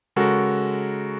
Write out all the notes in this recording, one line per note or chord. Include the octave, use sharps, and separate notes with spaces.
C#3 G#3 F#4 A4 A#4